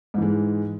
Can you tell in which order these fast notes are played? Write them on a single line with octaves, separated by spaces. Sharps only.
G#2 E3 G#3